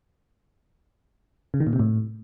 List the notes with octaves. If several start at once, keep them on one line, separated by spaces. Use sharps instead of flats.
C#3
D#3
A#2
C3
A2